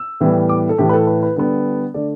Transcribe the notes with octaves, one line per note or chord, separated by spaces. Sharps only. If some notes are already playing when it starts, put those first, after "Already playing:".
Already playing: E6
A2 E3 G3 B3
D6
A4
A2 E3 A3 G4
B4
A4
B4
B4
D3 G3 B3 A4
D3 A3 D5